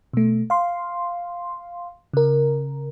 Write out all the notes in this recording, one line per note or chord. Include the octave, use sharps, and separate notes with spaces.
B2 A3
F5 C6
C#3 A#4